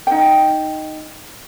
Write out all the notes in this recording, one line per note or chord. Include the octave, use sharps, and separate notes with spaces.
D#4 G5